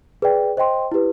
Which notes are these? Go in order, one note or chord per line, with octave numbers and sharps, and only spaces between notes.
G#4 B4 D5 G5
C5 D#5 G5 C6
E4 G4 B4